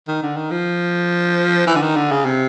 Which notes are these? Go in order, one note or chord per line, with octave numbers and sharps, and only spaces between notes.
D#3
D3
D#3
F3
E3
D3
D#3
D3
C#3
C3